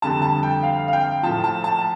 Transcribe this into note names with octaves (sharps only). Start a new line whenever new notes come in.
F2 D3 G3 A5
A5
G5
F5
F5
G5
A2 F3 A5
A5
A5